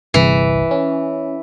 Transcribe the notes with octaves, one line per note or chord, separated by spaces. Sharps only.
G1 C2 E3
C#4